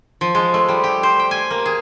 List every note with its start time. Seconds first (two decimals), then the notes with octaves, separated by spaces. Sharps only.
0.21 F3
0.35 G#3
0.54 A3
0.69 G3
0.84 G4
1.03 C5
1.20 G5
1.31 G#5
1.51 A#3
1.66 G#4